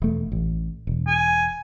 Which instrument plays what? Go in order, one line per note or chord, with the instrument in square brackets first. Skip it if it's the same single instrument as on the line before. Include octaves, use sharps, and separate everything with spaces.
[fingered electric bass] E1 A3
A1
E1
[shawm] G#5